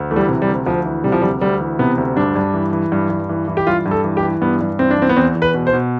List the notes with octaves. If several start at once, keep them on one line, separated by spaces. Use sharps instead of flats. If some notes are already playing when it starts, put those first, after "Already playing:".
Already playing: D2
E3 A3
G3
C3
G3
D2
D2 F3
E3
C3 G3
F3
D2 G3
D2 G3
E3
C3 B3
D2
G2 D4
G2
E3
E3
G2
G2
E3
E3
G4
G2 F4
G2
A4
E3
G4
E3
G2 B3
G2
E3 C4
D4
E3 C4
B3
E2 C4
E2
B4
B2
C5
B2